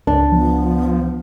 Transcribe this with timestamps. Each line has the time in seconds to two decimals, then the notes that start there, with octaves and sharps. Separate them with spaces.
0.07 C#2 D4
0.32 F3 B3